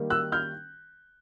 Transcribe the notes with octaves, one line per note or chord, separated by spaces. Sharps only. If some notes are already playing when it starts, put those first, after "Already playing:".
Already playing: D#3 G3 A#3
E6 F#6
F6 G6